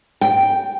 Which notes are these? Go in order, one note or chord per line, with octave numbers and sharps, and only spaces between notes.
G5